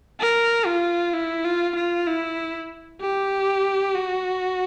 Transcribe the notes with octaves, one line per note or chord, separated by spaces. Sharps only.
A#4
F4
E4
F4
F4
E4
G4
F#4